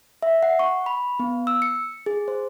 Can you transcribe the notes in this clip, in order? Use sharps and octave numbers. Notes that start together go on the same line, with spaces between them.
E5
F#5
C#6
B5
B3
E6
C#7
G#4
C5